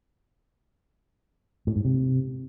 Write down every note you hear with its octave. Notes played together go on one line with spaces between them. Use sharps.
A2
G#2
C3